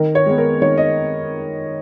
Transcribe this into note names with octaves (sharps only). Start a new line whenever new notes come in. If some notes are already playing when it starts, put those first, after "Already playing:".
Already playing: D#3 A#4
C#5
G#3 B3
A#4
D#3 C#5
D#5